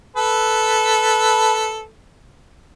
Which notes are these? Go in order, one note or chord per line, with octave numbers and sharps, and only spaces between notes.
A4 B4